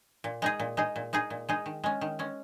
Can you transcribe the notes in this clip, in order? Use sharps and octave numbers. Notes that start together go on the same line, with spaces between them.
A#2
G#3 D#4 G#4
A#2
G#3 D#4 G#4
A#2
G#3 D#4 G#4
A#2
G#3 D#4 G#4
D#3
G#3 C#4
D#3
G#3 C#4